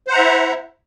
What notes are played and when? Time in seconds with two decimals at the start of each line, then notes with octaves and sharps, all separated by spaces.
0.08 C5
0.10 F#5
0.13 A#5
0.16 E5
0.18 E4